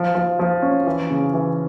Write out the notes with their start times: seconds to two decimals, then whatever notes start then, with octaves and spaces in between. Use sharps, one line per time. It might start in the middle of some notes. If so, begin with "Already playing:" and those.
Already playing: F3
0.15 F3
0.39 F3
0.62 C#4
0.87 E3
1.10 C#3
1.34 E3